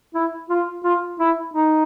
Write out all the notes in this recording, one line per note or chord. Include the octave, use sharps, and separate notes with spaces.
E4
F4
F4
E4
D#4